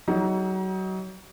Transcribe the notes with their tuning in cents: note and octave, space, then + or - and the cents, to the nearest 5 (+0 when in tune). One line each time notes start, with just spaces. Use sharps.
F#3 +30 D#4 +30 G#4 +0